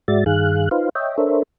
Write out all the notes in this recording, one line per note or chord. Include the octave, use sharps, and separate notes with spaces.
G#2 G#3 F#4 D5 E5 A6
G2 D#3 G#4 F5 F#6
D#4 F4 B4 C5 F5
C#5 D#5 E5 G5
D4 A4 A#4 C5 C#5 E5